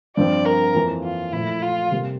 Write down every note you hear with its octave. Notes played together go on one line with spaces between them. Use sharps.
G2 F3 C4 D5
A#4
F2 E3 A#3
F4
A#2 F3 A3 E4
F4
C3 G3 A#3